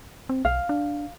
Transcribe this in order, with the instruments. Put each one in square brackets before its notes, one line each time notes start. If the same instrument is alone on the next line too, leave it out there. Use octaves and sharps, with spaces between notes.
[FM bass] C4
[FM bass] B1 [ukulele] F5
[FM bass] D4